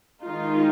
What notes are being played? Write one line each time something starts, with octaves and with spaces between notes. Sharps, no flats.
D#3 G#3 D#4 F4